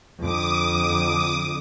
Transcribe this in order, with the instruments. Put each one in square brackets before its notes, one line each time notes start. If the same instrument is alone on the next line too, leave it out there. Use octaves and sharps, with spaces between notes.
[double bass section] F2 D3 [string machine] D6 D#6